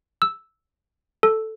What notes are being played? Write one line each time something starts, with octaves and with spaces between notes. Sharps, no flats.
E6
A4